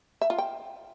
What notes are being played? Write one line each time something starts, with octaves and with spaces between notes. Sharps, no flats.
E5
F4
G5